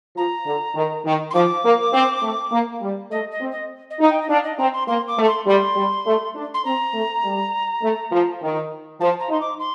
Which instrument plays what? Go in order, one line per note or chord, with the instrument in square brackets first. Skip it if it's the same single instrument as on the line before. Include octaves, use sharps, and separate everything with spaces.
[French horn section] F3 [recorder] A#5
[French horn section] D3
D#3
D#3
[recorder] C6
[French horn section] F3 [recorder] D6
[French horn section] A#3
C4
A3
A#3
G3
[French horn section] A3 [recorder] D#5
[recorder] D#5
[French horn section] C4
[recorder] D#5
D#5
[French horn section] D#4 [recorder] F5
[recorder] G5
D#5
[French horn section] D4 [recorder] F5
[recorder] D#5
[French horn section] C4 [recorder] A#5
[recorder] C6
[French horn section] A#3 [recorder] C6
[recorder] D6
[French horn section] A3
[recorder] C6
[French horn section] G3 [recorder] C6
[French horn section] G3
A3
D4
[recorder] C6
[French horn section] C4 [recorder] A#5
[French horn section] A3
G3
A3
F3
D#3
[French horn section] F3 [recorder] A5
[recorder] A#5
[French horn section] D#4 [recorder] C6
[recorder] D6
C6